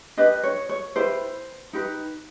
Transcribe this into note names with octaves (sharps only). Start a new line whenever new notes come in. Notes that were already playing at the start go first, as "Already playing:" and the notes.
D4 G4 B4 D#5
C#5
C#5
E4 G4 B4 C5
D#4 G4 B4